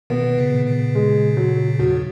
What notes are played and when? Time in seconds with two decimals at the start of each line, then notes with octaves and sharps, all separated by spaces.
0.10 B2 D#3 B3
0.38 A#2 C#3
0.66 A#2 C#3
0.95 G#3
1.37 F#3
1.79 E2 G#2 F#3